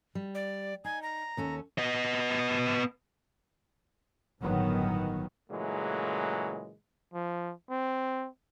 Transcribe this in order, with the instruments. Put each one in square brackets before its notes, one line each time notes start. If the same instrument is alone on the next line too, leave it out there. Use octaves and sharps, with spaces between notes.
[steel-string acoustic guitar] G3
[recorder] D5
[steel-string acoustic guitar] D#4 [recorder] G#5
[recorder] A#5
[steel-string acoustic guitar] D#2 C#4 A4
[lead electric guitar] B3 D#5
[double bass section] G1 A2 D#3 F#3 B3
[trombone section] A#2 C#3 E3 F#3 G#3 A3
[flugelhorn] F3
C4